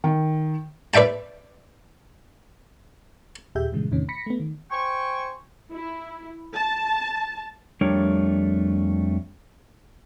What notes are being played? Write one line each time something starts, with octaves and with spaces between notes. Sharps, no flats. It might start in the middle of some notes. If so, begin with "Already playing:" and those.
D#3
B4 D5 E5 G5 A5
D#2 A#2 G4 G#4 E5 G6
G2 A#2 C#3 E3 G#3
E2 A2 C3 D#3 C#4
B5 A#6 B6 C#7
A3 B3
D#3
C5 G5 G#5 C#6
E4
A5
F2 G3 A3 D4 A#4 C#5